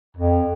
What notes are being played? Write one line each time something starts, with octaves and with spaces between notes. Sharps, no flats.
F2